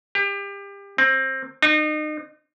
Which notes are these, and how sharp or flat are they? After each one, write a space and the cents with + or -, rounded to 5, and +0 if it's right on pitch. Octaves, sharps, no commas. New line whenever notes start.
G4 +30
C4 +20
D#4 -35